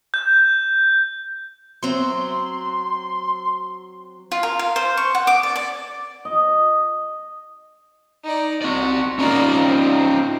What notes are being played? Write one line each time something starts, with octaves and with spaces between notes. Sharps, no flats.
G6
F#3 C4 C6
F4
A#4
F5
C5
C#6
F#5
D6
D5
D5
D#5
D#4 D5
C4 F#4 D5
A#3 C#4 D#4 F4 D5
C4